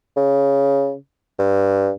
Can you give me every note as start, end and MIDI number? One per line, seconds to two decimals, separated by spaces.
0.17 0.95 49
1.39 1.90 43